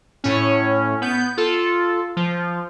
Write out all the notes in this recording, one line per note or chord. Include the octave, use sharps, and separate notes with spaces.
A2 C#4
B3 G6
F4 A4
F3